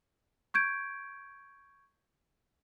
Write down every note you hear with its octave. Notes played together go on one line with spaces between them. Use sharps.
C#6 G6 G#6 D7